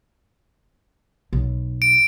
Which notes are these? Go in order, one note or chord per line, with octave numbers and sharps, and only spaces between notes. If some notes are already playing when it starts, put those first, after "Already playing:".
B1
D7